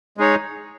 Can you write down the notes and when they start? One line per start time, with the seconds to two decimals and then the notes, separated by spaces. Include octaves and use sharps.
0.17 G#3 D#4 G#4 C#5